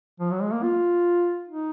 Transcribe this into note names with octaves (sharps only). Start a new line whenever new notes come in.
F3
F#3
G#3
A#3
F4
D#4